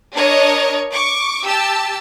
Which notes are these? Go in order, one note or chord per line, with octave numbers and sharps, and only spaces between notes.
D4 A#4 C#5 D#5
C#6 D6
G4 A5 E6